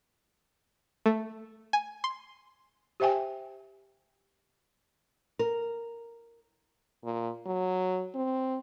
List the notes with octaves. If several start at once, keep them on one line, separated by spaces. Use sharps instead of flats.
A3
G#5
C6
G4 C5 E5 G5 G#5
A#4
A#2
F#3
C4